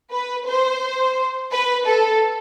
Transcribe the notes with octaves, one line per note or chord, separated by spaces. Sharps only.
B4
C5
B4
A4